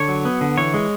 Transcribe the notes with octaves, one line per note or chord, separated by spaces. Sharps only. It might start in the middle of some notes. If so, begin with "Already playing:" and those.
Already playing: D3 C#5
F#3
B3
D3
E3 C#5
G#3